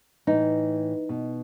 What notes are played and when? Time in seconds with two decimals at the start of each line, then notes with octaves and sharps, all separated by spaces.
0.27 A2 E3 D#4
1.09 B2